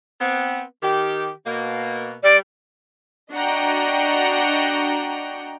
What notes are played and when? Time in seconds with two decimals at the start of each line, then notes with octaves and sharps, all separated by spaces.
0.21 B3 C4
0.83 D#3 G4
1.46 B2 A#3
2.23 G3 D5
3.33 D4 F#4 D#5 F#5 G5 A#5